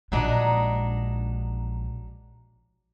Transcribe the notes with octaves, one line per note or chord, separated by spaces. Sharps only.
A#1 F#3 G#3 D4 D#4